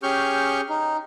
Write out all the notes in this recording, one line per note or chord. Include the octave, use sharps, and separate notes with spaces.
C#4 G4 G#4 C#6 F6 G6
D#4